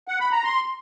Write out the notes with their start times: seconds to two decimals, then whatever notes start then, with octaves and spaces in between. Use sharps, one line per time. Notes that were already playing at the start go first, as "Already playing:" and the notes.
0.08 F#5
0.20 B5
0.32 A#5
0.44 C6